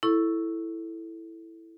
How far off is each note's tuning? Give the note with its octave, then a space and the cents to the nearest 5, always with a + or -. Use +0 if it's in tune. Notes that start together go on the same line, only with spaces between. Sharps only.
E4 +0 A4 +0 C#6 +0